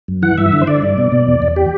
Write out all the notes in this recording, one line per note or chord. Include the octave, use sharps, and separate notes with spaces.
F#2
E3 F#5
G2 E5
D3
C5
D3 D5
G2
B2
B2
E2
E2
G4